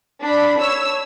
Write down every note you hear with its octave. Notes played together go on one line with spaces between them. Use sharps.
D4 B5
C#5 E6